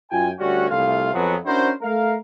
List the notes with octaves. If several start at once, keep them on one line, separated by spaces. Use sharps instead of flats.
F#2 F4 G5 G#5
D2 G3 C#4 F#4
C2 A3 F4 F5
F2 F3 F#3 G#3 B3
C#4 D4 E4 F#4 A#4 C5
A3 A#4 F5